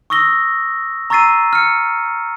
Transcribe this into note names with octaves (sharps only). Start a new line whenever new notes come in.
C#6 D#6 E6 A#6 G7
A#5 C#6 E6 A6 C7 D#7
F6 C#7